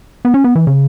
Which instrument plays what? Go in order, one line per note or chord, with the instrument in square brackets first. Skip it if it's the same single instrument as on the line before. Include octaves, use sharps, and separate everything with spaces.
[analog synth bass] B3
C#4
B3
E3
C#3